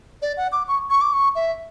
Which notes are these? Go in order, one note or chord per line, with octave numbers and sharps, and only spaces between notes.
D5
F#5
D6
C#6
C#6
D6
C#6
E5